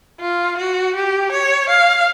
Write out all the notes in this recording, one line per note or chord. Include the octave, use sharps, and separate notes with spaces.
F4
F#4
G4
C#5
F5